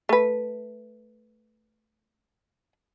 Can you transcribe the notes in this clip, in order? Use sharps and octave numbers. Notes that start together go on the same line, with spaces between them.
A3 B4